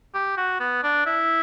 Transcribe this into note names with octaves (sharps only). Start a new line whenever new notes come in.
G4
F#4
B3
D4
E4